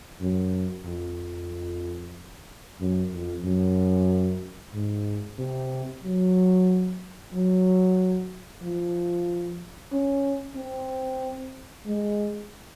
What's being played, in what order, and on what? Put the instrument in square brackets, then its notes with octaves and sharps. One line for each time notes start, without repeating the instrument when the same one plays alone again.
[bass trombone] F#2
F2
F#2
F2
F#2
G#2
C3
F#3
F#3
F3
C#4
C4
G#3